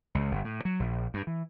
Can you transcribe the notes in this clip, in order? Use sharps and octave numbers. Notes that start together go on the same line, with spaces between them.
C#2
G1
A2
F#3
A#1
G2
E3